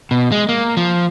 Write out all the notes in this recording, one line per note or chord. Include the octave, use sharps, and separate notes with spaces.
B2
G#3
A#3
F3